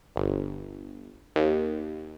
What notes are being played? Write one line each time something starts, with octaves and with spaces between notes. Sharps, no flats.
G1
D#2